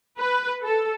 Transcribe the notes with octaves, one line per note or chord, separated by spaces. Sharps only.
B4
A4